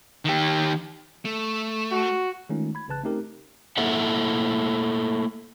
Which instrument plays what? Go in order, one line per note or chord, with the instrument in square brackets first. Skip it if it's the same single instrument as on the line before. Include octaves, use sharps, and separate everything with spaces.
[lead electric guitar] D#3 G4
A3
[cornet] F#4
[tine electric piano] D#3 G#3 A3 C#4 D#4 F4
B5 G#6
A1 C#3 B4 A5 F#6
A3 C4 C#4 D#4 G4 A#4
[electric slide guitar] A3 A#3 E4 A4 E5 F#5